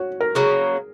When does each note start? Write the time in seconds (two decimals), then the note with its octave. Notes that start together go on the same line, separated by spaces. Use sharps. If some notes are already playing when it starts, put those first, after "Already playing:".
Already playing: F#4 C#5
0.21 A#4
0.35 C#3 F#3 A#3 G#4